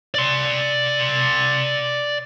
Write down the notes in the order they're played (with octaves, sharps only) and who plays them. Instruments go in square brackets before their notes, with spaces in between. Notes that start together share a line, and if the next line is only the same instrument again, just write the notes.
[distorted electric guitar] D5 C6